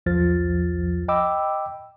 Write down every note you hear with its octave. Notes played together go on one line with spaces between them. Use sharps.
B1 E2 F3 F6 A6
D#5 G5 B5 D6 E6